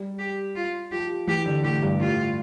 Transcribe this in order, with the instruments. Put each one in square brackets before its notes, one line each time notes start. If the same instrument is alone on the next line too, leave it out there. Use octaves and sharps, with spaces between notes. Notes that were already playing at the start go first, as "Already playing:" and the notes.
Already playing: [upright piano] G3
[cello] G4
F4
[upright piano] F3 [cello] G4
[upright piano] E3 [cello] G4
[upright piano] D3
[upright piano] A2 [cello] G4
[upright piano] G2
[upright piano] A2 [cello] F4